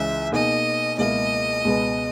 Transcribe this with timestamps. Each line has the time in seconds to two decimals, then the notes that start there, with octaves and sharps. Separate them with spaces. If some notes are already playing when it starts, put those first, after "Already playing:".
Already playing: C#2 C#3 E3 E5
0.32 B2 A#3 D#4 G#4 D#5
0.98 C#2 B2 A#3 E4 D#5
1.65 C#2 B2 G#3 B3